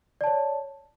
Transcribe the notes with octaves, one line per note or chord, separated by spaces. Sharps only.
C#5 D5 A5